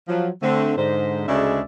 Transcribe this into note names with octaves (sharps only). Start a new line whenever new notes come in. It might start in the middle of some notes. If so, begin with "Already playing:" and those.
F3 F#3
D3 A3 C4
G#2 D3 C5
D2 C#3 G#3 D4 D5 E5